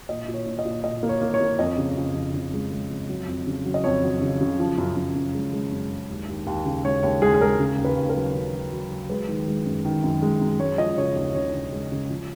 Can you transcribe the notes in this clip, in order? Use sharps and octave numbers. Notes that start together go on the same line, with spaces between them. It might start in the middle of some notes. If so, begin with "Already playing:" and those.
A#2 D#5
A#2
C#5
A#2
D#5
A#2
A#2 D#5
A#3
C#5
A#3
C#5
A#3
F2 D#5
C#3
F2
F2
C#3
G#3
G#3
F2
F#3
F2
C#3
F#3
D#5
F2 C#5
F#3
C#3
C#3
F3
F#2
F#2
F#2
G#3
G#3
F#2
G#3
D#2
D#2
D#2
C#3
G#3 C#5
D#2 C#5
G#3 G#4
G#4
G#3 A#4
C#3
D#2
B4
D#2
A#4
F#3
C#3
F#3
F#3
F#3
G#3 B4
D#3
G#3
F#2
D#3
F#2
G#3
F#2
G#3 C#5
F3 D#5
C#3 C#5
D#2 C#5
C#3 C#5
C#3
G#3
C#3
F3